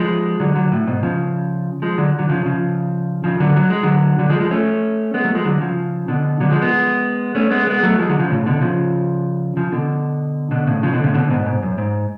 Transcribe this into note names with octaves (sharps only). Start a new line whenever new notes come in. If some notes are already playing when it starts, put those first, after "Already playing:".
Already playing: F3 G#3
D3 F#3
D3 F#3
A2
G#2 B2
C#3 F3
F3 G#3
D3 F#3
D3 F#3
C#3 F3
C#3 F3
C#3 F3
D3 F#3
F#3
G#3
D3 F#3
D3 F#3
F3 G#3
F3 G#3
A3 C#4
G#3 B3
F#3 A3
F3 G#3
D3 F#3
C#3 F3
B2 D3
D3 F#3
F3 G#3
G#3 B3
A3 C#4
G#3 B3
G#3 B3
F#3 A3
F3 G#3
D3 F#3
C#3 F3
A2 C#3
B2 D3
C#3 F3
C#3 F3
B2 D3
B2 D3
A2 C#3
C#3 F3
B2 D3
A2 C#3
B2 D3
G#2 B2
G#2
F#2
G#2